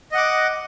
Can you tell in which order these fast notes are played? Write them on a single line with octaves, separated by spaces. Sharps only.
D#5 F#5 D6